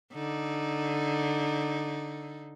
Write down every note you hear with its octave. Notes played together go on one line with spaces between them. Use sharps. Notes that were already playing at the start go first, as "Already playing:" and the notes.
D3 D#4